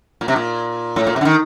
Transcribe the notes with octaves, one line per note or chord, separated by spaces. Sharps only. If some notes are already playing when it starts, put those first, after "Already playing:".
A#2
C3
A#2
A2
A#2
C3
D3
D#3